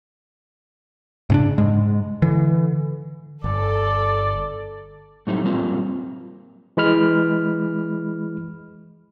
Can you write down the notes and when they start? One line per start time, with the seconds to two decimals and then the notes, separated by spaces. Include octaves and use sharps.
1.30 G#2 C#3 C#4 D4
1.58 G#2 G#3
2.22 D3 E3
3.44 G1 A4 D5
5.27 A2 F#3 G3 A3 C4 D#4
5.43 F#3 G3 A#3 C4 E4 F4
6.77 E3 G#3 B5 F6